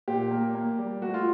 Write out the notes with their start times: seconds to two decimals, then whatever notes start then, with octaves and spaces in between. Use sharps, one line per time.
0.08 A#2 G4
0.31 A#3
0.55 A#3
0.78 G3
1.02 A3 F#4
1.14 F4